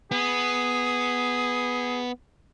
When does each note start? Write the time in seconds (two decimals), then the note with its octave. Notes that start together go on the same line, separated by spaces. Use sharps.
0.11 B3 G#4